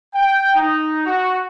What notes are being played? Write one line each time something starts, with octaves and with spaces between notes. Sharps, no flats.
G5
D#4
F#4